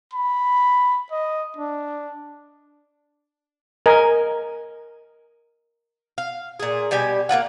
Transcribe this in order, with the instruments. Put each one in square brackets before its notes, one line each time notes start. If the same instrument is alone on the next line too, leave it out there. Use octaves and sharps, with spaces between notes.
[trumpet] B5
D#5
D4
[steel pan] A#4 D#5 G#5
[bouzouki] F5
A#2 G#4
B2 G3 G4 G#5
A#3 B3 F4 F#5